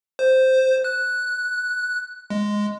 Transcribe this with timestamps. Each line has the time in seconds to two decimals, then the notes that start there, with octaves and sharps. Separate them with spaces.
0.19 C5
0.84 F#6
2.30 G#3